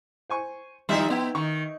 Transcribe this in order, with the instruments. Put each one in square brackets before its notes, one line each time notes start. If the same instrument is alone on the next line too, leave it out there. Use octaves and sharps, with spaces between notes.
[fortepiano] C5 G#5 C#6
[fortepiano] D#3 F3 [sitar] G3 D#4 E5
[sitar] B3 [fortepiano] D#4 G5
[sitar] D#3 [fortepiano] C#6